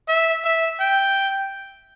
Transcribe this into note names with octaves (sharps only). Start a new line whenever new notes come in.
E5
E5
G5